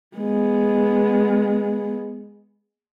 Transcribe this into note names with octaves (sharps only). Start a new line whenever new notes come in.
G#3 B3